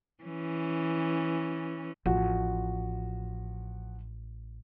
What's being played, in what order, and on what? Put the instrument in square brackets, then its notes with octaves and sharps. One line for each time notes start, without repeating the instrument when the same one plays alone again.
[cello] E3 C#4
[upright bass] A1 [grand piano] F3 F#4